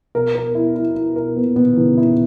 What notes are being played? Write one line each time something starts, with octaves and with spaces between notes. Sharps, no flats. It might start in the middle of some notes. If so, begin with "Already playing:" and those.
B2 A#4
A#4
E4
E4
E4
A#4
A#2 B3
B2 B3
D#3
C#3 E3
D#3
C#3 E4